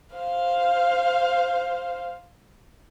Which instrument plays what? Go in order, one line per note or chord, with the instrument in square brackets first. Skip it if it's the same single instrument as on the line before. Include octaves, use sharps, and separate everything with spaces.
[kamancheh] C5 F5